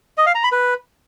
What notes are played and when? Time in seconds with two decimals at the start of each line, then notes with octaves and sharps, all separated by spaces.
0.18 D#5
0.26 F5
0.35 A#5
0.43 B5
0.52 B4